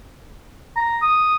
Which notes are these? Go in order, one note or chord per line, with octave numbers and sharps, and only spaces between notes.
A#5
D#6